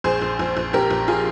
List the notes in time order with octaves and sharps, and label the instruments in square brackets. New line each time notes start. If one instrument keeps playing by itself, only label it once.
[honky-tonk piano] A#1 G#4 C5
A#1
A#1
A#1
A#1 G4 A#4
A#1
F4 G#4